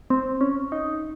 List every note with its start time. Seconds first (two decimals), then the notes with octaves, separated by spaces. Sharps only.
0.10 C4
0.41 C#4
0.72 D#4